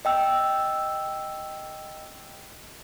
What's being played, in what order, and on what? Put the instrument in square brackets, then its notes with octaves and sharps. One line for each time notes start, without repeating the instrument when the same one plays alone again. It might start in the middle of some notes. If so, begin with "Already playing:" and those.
[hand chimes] D#5 G5 E6